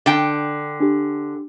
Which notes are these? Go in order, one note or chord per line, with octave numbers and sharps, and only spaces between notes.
D3 G5
D4 G4